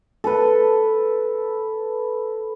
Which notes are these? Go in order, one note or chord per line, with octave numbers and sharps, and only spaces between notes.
A4 B4